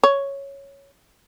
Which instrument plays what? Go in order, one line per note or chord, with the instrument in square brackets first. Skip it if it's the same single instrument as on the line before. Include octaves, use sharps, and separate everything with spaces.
[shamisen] C#5